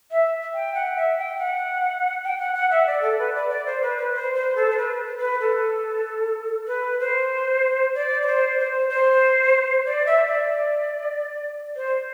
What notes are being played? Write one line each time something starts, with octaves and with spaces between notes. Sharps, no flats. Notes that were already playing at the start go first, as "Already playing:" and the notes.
E5
G5
F#5
E5
G5
F#5
G5
F#5
F#5
E5
D5
A4
B4
D5
D5
C5
B4
B4
C5
C5
A4
C5
B4
B4
A4
B4
C5
D5
D5
C5
C5
C5
D5
E5
D5
C5